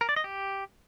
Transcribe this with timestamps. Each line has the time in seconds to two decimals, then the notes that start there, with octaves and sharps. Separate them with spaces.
0.01 A#4
0.09 D5
0.16 D#5
0.24 G4